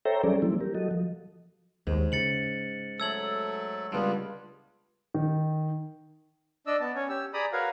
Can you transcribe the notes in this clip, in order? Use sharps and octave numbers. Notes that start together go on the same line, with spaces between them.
A4 C5 C#5 E5 G5 A#5
F#3 G3 C#4 G#4 A4 D5
E3 F#3 G3 A#3 C4 E4
G4 A#4
F#3 F#4 A4 D#5
F3
D#2 G#2
C#3 A6 C#7 F#7
F#3 A3 A4 E6 G#6 F#7
C#2 G3 B3 D4 F4
D#3
D4 D5 D#5 E6
B3 A5
C#4 C#5
G4 E6
G#4 D5 A#5 B5 D#6
F#4 A#4 B4 C#5 F5